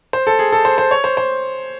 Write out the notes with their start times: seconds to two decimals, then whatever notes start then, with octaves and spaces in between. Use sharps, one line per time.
0.13 C5
0.27 A4
0.39 G#4
0.52 A4
0.65 C5
0.78 C5
0.91 C#5
1.04 C5
1.17 C5